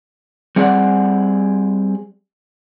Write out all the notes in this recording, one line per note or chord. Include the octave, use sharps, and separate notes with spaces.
G3 C4 G#4 C#5 D5 F#5